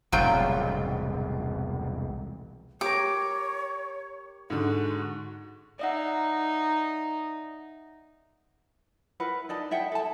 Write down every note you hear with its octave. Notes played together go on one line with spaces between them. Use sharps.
E1 C2 A2 F#3 F4 G5
G4 A#4 C#5 D6
G#2 D3 F#4
D#4 D5 E5 F#5
E4 A#4 B4 F#5
D#4 D5 A5
E4 E5 F#5 G5
A4 A5